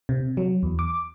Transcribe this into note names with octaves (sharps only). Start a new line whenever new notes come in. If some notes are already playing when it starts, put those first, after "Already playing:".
C3
F#3
E2
D6